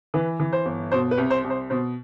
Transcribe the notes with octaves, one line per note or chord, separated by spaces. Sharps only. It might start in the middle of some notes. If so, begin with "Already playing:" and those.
E3 B4
E3
C5
G1
B2 C5
B4
C2
C5
C2
C5
B2 C5